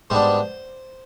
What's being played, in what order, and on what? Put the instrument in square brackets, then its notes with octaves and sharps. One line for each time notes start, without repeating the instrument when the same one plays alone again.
[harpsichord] G#2 G3 B3 D4 C5